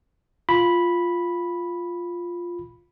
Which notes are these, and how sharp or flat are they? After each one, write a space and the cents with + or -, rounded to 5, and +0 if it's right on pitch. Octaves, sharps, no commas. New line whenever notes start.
F4 +0 B5 -5